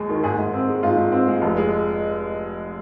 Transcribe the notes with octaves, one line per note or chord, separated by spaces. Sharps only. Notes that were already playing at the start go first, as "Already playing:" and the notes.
Already playing: D#2 G#3
D#3
G#2 G#4
G#2
C4
G#3
G#2 F4
G#2
C4
G#3
F1
G#3